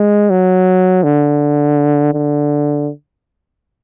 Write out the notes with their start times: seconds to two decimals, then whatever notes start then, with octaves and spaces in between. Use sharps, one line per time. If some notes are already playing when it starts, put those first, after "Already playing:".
Already playing: G#3
0.30 F#3
1.03 D3
2.14 D3